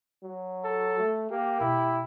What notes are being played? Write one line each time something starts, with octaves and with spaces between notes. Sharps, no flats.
F#3
A4
A3
A#3 G4
B2 B3 E4